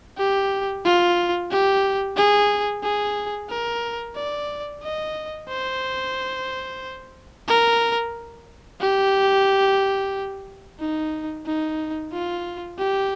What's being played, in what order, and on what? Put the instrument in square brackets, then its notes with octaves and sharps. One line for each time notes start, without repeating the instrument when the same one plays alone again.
[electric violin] G4
F4
G4
G#4
G#4
A#4
D5
D#5
C5
A#4
G4
D#4
D#4
F4
G4